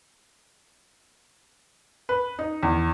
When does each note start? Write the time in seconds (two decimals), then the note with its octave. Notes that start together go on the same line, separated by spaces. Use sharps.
2.09 B4
2.39 D#4
2.63 E2